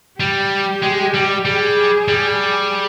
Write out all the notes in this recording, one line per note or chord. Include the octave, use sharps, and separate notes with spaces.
G3 G4
G#3
G3
G3 G#4
G3